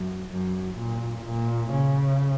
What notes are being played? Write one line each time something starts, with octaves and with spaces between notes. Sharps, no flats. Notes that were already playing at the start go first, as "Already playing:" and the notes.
Already playing: F#2
F#2
A#2
A#2
C#3